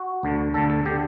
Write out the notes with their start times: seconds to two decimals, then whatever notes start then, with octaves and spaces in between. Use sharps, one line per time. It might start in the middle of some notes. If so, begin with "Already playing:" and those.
Already playing: F#4
0.23 D2 D3
0.54 D2 D3 A4
0.70 A4
0.85 D3 G4